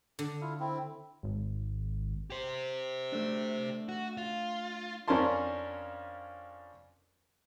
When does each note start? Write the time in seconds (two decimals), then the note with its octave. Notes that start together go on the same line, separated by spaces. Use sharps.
0.19 D3
0.41 E4 F4
0.60 C4 E4
1.23 G#1
2.30 G4 C5
3.12 A3 D4
3.89 F#4
4.17 F4
5.08 F2 C#4 D4 A#4 A5 C6